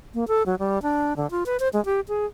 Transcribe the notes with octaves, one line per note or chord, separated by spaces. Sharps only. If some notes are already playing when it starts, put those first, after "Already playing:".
A#3
A4
F#3
G3
D4
D3
F4
B4
C5
G#3
G4
G#4